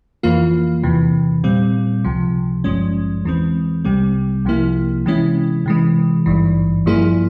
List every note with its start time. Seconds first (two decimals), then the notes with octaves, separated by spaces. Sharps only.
0.23 F2 E3 A#3 F4
0.83 E2 C3 E3
1.44 A#2 G3 C4
2.04 C#2 C3 F3
2.64 G#1 G2 F3 G#3 C#4
3.25 E2 E3 G#3 C4
3.85 C2 C3 G3 C4
4.45 C2 C3 F3 A#3 E4
5.06 C3 E3 G#3 C#4 E4
5.66 C3 E3 G#3
6.26 G#1 G2 E3
6.86 G2 F3 A#3 E4 G#4